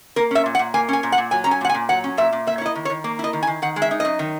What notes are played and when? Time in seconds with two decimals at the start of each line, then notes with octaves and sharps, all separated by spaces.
0.16 A#3 A#4
0.31 C#4 E5
0.46 A#2
0.55 F#5
0.59 A#2
0.74 A#3 G#5
0.89 C#4 G#5
1.03 A#2
1.12 F#5
1.18 A#2
1.31 F#3 G#5
1.44 C#4 A#5
1.51 G#5
1.61 A#2 F#5
1.69 G#5
1.74 A#2
1.89 F#3 F#5
2.04 C#4
2.17 A#2 E5
2.33 A#2
2.47 A#3 E5
2.58 C#5
2.61 E4 D#5
2.75 D#3
2.85 C#5
2.90 D#3
3.04 A#3
3.19 E4 D#5
3.33 D#3
3.43 G#5
3.47 D#3
3.62 D#3 F#5
3.76 G#3
3.82 E5
3.91 D#4
4.00 F#2 D#5
4.19 D#3